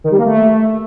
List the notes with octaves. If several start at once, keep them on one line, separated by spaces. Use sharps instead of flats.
D#3
G3
A#3
A3